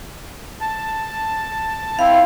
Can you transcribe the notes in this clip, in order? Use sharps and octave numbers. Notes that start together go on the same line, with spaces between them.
A5
C4 E4 F5